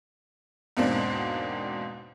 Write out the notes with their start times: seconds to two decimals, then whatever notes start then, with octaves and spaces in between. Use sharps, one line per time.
0.77 E2 G#2 B2 A#3 C4 D4